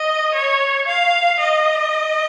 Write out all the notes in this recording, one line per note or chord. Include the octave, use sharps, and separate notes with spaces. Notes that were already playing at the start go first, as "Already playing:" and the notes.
Already playing: D#5
C#5
F5
D#5